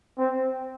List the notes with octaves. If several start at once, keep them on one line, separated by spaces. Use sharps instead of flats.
C4